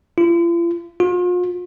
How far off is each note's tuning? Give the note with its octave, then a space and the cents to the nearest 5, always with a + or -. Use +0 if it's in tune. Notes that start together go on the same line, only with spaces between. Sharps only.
F4 -45
F4 +40